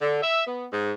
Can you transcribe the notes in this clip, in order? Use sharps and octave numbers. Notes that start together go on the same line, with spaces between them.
D3
E5
B3
G#2